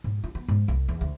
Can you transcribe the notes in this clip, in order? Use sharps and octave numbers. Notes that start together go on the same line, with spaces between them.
G#2
F4
B3
G#2
C2
E2
D2